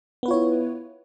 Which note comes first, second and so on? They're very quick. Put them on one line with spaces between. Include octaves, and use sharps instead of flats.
B3 B4 F4 C#5 E4